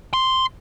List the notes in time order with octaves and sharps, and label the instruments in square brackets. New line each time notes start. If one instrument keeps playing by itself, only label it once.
[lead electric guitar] C6